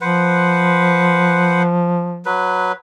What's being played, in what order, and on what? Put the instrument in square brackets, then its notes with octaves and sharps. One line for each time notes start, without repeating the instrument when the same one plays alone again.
[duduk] F3 [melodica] B4 C5 F#5
[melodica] F#3 B4